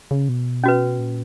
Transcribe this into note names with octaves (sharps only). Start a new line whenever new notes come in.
C#3
B2
C#4 F#4 B4
A#2